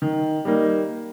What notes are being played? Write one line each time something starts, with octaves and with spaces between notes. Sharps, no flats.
D#3
G3 A#3 D#4